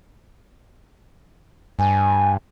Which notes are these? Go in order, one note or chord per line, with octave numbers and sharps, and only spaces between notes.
G2 G#5